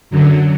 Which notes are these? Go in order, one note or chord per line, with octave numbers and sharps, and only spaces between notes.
F#2 D3 F#3